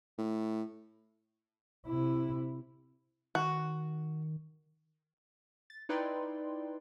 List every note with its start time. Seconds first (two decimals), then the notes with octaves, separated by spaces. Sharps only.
0.18 A2
1.87 C3 E4
3.35 D#3 F#4
5.70 A6
5.89 D#4 E4 B4 D5 G5 C6